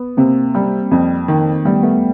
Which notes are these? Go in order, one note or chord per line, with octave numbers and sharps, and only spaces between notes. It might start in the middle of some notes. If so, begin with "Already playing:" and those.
Already playing: B3
C3 A#3 C4
G3
F2
D#3
G3 A3 B3
A3 B3